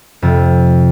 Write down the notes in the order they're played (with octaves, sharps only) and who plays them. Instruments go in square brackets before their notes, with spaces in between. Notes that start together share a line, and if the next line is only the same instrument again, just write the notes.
[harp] F2 C3